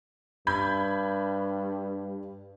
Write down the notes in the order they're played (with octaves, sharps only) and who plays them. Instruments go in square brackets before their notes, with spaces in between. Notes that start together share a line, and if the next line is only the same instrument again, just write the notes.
[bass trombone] G2 [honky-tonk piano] B5 G6 G#6